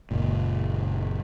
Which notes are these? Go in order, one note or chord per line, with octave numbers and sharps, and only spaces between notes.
F#1 A#2